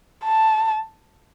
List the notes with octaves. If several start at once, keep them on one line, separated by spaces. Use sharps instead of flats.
A5